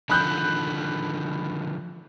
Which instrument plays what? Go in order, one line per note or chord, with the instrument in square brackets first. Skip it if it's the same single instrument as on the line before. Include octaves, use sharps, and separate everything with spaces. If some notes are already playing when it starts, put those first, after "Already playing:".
[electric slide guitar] D3 D#3 F3 [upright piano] B5 F#6 G6